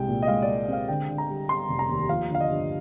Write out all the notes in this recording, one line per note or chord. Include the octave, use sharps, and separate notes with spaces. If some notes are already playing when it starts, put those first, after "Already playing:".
Already playing: C2 G#3 G5
A#2
D#5
G#3 F5
D5
G#3
C4 F5
D3 G5
D3
A#5
G3
G3 C6
F1
A#5
D#2
F3 F5
D3 F5
D#5
G2